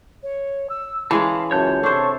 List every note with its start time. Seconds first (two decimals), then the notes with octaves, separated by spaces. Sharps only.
0.23 C#5
0.69 E6
1.11 E3 G#3 C#4 F5 A5 B5
1.51 C#2 F#2 C#5 A5 G6
1.83 C3 D4 A4 C5 C#6